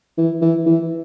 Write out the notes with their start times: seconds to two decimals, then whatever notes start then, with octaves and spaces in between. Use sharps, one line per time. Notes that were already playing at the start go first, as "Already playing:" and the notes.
0.18 E3
0.42 E3
0.66 E3